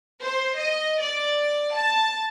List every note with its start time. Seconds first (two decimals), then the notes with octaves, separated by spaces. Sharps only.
0.22 C5
0.57 D#5
1.01 D5
1.75 A5